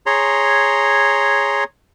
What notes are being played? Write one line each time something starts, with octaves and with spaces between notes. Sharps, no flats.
G#4 C#5 A#5 C6